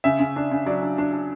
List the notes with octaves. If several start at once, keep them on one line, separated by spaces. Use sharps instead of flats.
C#3 E5
C#3
D4
C#3
F#3 D5
D4
D4
D4